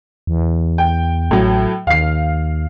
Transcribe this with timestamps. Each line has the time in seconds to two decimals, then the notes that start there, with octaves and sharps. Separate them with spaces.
0.27 E2
0.78 G5
1.31 A1 A2 F#3
1.87 D#2 F5 C7